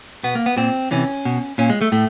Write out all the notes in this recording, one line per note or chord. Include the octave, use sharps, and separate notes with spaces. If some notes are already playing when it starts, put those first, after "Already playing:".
B2 B3
A#3
B3
A#2 C4
C3 E3 C#4
B2
A#2 C#4
G#3
A3
A2 A3